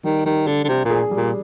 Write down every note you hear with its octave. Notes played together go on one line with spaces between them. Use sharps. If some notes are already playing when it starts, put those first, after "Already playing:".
D#3 G3
D#3 G3
D3 D4
D3
C3 D4
A#2 G#4
G3
A#2